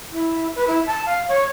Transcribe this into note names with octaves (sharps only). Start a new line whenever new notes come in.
E4
B4
E4
A5
F5
C#5